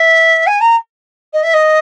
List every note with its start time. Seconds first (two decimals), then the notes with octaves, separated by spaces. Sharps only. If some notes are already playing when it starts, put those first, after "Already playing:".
Already playing: E5
0.47 G#5
0.61 A#5
1.33 D#5
1.43 E5
1.54 D#5